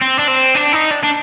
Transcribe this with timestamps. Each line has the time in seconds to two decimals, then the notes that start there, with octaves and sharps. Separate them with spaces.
0.01 C4
0.19 D4
0.28 C4
0.55 D4
0.73 D#4
0.91 D4
1.03 D4